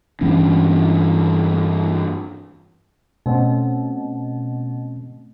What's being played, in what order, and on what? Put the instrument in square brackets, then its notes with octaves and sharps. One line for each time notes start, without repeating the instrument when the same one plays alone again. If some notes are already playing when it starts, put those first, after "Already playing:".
[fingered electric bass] G2 E3 C#4 D4
[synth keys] B2 [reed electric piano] A3 C4 C#4